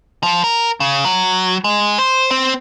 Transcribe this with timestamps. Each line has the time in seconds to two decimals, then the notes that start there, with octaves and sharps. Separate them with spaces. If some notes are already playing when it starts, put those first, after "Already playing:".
0.23 F3
0.44 A#4
0.80 C#3
1.05 F#3
1.64 G#3
1.99 C5
2.31 C4